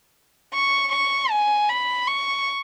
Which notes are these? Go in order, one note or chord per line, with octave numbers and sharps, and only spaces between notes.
C#6
C#6
G#5
B5
C#6